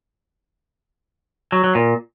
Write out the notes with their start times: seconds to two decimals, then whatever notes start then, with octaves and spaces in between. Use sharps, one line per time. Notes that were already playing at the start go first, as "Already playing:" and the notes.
1.52 F#3
1.64 F#3
1.75 A#2